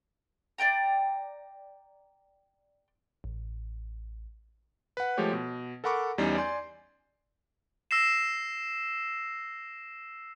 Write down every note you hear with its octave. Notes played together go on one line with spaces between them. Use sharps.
D5 D#5 G5 A#5
A1
B4 F#5
F3 G#3 A3 G4 C#5
B2
A4 A#4 F#5 B5 C#6 D6
E2 G3 C#4 D#4 C7
D5 G#5 C6 G6
E6 A#6 C7 E7